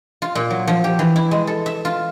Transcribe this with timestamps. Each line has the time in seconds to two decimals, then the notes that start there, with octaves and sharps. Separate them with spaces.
0.22 F4
0.35 A#2
0.50 F#3
0.68 F3
0.84 G4
0.99 E3
1.16 E4
1.31 G#3
1.47 A4
1.66 E5
1.85 F4